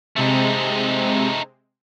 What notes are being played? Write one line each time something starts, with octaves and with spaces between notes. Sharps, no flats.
C3 G#3 A3 C4 D#4